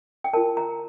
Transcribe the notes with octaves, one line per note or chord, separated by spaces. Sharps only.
G5
F4 A#4 A5
A#5